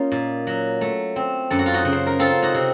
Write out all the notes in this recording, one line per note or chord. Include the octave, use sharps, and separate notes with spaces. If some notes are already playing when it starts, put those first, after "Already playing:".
Already playing: A#3 C#4 D#4 F4
A#2
F#3
A3
C4
F#2 A4
F#4
F4
D#4 F#4
C#3
C5
A#4
C4 F4 A4
D#4 F#4
C3